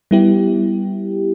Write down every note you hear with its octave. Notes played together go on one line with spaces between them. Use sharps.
G3 B3 E4 G4